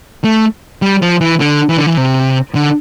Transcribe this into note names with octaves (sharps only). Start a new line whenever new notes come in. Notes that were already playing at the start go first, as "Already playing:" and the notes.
A3
G3
F3
E3
D3
E3
D3
E3
C3
D3